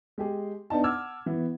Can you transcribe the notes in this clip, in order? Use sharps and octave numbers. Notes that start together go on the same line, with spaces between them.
G#3 G4 G#4
B3 D4 D#4 A5
F#5 A5 D6 E6 F6 G#6
E3 B3 E4